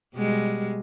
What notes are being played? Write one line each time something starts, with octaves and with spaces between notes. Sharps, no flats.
B2 G3 G#3